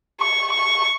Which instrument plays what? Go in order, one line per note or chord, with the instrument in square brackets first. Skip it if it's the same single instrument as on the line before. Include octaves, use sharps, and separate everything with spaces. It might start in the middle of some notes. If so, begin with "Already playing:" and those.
[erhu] C#6
C#6